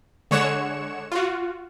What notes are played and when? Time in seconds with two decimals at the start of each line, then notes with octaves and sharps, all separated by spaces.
0.31 D3 G#3 C#5 F#5 C#7 E7
1.12 F4 F#4